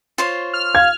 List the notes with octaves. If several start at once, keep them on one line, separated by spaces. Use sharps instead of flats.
F4 C5 C#5
F6
F5 G#6